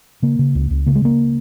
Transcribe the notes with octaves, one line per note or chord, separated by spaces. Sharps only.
C#3 A#3
C#3
C#2
C#2
C#3 A#3
G#3
C#3 A#3